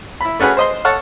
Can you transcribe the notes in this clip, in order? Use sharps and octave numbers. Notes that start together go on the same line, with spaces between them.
E4 B5
A3 C#4 F#4 G#4 B4
C5 D#5 C6
A4 C#5 F#5 F6